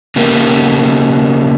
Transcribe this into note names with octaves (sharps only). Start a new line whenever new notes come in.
C#3 A#3 B3 G4